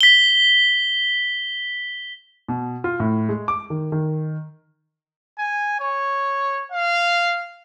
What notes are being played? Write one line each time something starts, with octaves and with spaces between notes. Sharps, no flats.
B6 G7
B2
F4
A2
G#3
D6
D#3
D#3
G#5
C#5
F5